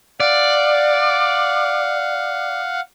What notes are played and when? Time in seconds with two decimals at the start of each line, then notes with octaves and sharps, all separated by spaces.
0.20 D5 F5 F#5